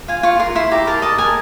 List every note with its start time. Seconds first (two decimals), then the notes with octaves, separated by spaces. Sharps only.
0.08 F4 G#5
0.23 F4 C#6
0.39 A#4 C6
0.55 E4 C6
0.71 G4 A#5
0.87 A#4 A5
1.02 D#5 A5
1.18 A#4 G#5